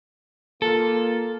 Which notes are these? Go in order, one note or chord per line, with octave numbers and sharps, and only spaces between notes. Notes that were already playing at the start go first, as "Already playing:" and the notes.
A#3 F4 A4